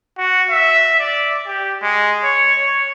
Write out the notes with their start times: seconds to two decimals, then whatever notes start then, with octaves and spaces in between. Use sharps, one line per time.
0.18 F#4
0.50 E5
1.00 D5
1.47 G4
1.82 G#3
2.24 C#5
2.62 C#5